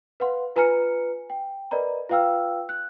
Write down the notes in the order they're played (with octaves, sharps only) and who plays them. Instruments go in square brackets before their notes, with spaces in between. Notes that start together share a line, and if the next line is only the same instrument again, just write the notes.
[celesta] B4 F5 F#5 C6
F4 B4 G#5 A#5 F6 C#7
G5
A#4 B4 D5 D#5 A#5 B5
F4 B4 F5 G5 E6 F6
F#6